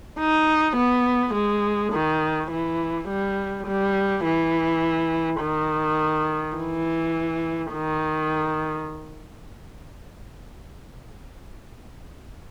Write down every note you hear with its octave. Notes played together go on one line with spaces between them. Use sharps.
D#4
B3
G#3
D#3
E3
G3
G3
E3
D#3
E3
D#3